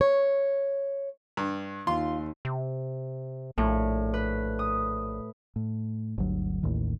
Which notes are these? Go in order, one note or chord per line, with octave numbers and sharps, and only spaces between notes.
C#5
G2
D#2 F4 C6
C3
A#1 A2
B4
D#6
A2
G1 D2 F#3
A1 D#2 A2 D#3